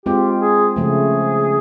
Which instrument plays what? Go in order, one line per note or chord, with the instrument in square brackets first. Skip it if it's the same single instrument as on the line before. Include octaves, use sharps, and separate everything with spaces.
[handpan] G#3 C4 F4 [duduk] G4
[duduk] G#4
[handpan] C#3 F3 A3 [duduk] G#4